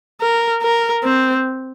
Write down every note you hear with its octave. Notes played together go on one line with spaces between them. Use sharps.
A#4
A#4
C4